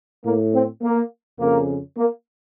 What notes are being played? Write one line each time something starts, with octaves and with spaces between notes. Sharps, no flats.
A2 A#3
C4
A#3
F2 C#3 A#3
A#3